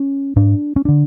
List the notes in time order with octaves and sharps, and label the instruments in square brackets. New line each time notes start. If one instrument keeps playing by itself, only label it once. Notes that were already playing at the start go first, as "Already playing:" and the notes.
Already playing: [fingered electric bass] C#4
G#2 D4
C#4
D3 D4